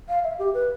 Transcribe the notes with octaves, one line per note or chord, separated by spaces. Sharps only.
F5
E5
G4
B4